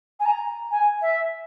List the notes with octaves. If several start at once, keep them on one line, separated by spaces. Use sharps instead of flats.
G#5
A#5
G#5
E5